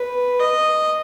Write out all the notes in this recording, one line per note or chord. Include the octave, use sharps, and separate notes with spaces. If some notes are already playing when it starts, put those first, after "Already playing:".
Already playing: B4
D#5